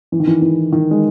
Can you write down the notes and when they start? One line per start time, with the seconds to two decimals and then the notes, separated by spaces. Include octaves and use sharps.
0.12 E3
0.20 D#3
0.27 E3
0.42 E3
0.72 D#3
0.91 G#3